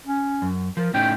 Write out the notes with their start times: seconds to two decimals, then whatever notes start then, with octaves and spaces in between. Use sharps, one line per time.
0.06 C#4
0.42 F#2
0.77 F3 A#4
0.94 A2 C#4 D#4 G5